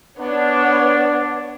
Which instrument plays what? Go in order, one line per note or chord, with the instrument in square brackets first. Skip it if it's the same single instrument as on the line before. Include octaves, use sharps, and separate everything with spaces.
[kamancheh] B3 C#5 [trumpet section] D4